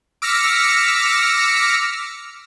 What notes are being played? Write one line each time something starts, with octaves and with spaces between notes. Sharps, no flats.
D6 E6 F6 A#6 B6 C#7